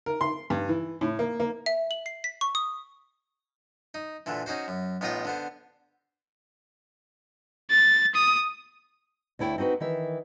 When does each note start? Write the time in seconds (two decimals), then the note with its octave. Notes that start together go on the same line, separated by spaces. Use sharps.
0.06 A#4
0.21 C6
0.50 G2
0.69 E3
1.01 A2
1.19 A#3
1.40 A#3
1.66 E5
1.91 F#7
2.06 C7
2.24 B6
2.41 C#6
2.55 D#6
3.94 D#4
4.26 A#2 D3 E3
4.46 C#4 D#4 F#4 C5
4.68 F#2
5.01 A1 B3 D#4 F4 D#5 G5
5.25 D3 B3 C5
7.71 A6
8.15 D#6
9.39 D2 A3 E4 C#5 G5
9.58 C4 D#4 F#4 B4
9.80 D#3 E3 E5